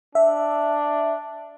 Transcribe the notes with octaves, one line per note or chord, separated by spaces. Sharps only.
D4 E5